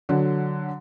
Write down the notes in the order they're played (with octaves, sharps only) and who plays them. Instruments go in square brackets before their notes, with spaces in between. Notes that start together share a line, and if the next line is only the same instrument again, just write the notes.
[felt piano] D3 F#3